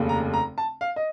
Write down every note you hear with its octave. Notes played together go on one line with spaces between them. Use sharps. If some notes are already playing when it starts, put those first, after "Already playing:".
Already playing: F1 D#2 C#3
A#5
A#5
A5
F5
D#5